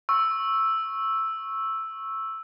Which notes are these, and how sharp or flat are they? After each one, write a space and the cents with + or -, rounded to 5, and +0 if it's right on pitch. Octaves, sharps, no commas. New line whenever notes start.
C#6 -15 E6 +0